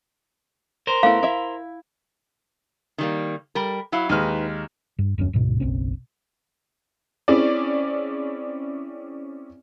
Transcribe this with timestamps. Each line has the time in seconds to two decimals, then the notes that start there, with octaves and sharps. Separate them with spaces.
0.87 A#4 C5
1.03 A3 B3 E4 F5
1.23 E4 E5
2.98 D#3 G3 A#3
3.55 G3 A#4
3.92 F#3 E4 F5
4.09 D#2 G#3 D#4 B4 F6
4.99 G2
5.18 D#1 F#2 C4 C#4
5.33 D1 G#2 B2
5.60 F#1 B1 C4 C#4
7.28 C4 C#4 E4 G#4 D5